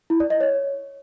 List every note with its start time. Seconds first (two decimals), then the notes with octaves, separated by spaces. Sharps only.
0.10 E4
0.20 D5
0.30 D#5
0.41 C#5